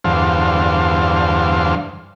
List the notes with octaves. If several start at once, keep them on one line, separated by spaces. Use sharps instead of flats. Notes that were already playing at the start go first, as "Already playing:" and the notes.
E2 G2 D3 C5 F5